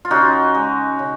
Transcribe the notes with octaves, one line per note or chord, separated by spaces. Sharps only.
F4
C#3 D#4 F#4
G#3
C#3